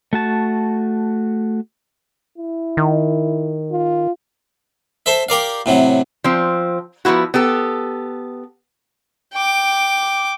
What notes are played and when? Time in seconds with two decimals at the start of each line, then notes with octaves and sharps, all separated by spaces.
0.13 A3 F#4 A5
2.38 E4
2.77 D#3
3.72 F4
5.06 A4 C5 E5
5.29 G4 A#4 D5 F5
5.66 A2 C3 F#3
6.24 F3 C4
7.05 F3 A#3 B3 E4 F#4
7.34 B3 G4 A4
9.33 G5 D6